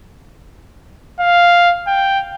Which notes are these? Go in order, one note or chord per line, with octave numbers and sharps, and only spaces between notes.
F5
G5